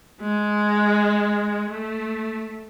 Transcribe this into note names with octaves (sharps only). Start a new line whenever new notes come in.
G#3
A3